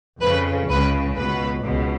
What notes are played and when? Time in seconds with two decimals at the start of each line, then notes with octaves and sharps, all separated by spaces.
0.21 F2 C#3 B4
0.69 C#2 C#3 B4
1.17 C#2 B2 B4
1.65 C#2 B2